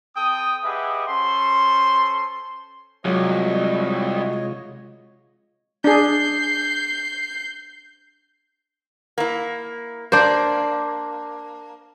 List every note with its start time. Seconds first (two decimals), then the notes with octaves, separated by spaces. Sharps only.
0.16 C4 A4 G5 D#6
0.64 G4 G#4 B4 D#5 E5 F#5
1.08 C#4 A4 C5 C6
3.05 C2 C3 F#3 G#3 F4 C#5 D#5
5.84 D4 G#4 G6 C7
9.18 A#3 E4
10.12 A#3 D4 C5 D5